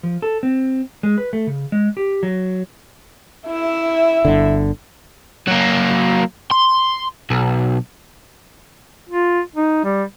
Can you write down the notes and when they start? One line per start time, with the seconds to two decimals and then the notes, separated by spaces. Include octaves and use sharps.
0.03 F3
0.22 A4
0.43 C4
1.03 G#3
1.18 B4
1.33 A3
1.47 C#3
1.72 G#3
1.97 G4
2.23 F#3
3.48 E4 E5
4.25 G1 D3
5.48 F#3 A#3
6.51 C6
7.30 B1
9.09 F4
9.55 D#4
9.84 G3